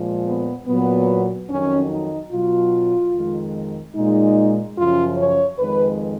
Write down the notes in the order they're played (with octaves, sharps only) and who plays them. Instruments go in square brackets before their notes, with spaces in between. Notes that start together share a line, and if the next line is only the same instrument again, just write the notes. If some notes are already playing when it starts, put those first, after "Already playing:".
Already playing: [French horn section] A#2 F3 G#3
B3
A#2 F#3 B3
F2 D#3 F#3 C#4
D#4
B2 F#3 F4
F2 D#3 G#3
A#2 G#3 D#4
F#2 C#3 F3 F4
C#5
F2 D#3 G#3 B4